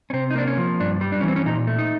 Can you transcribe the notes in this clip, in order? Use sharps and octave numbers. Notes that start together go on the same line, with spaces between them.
C#4
C3 C4
D#4
A#3 D4
C#4
F3
G2 D4
G3
D4
E3 C#4
C4
C#4
A#2 D#4
A3
D#4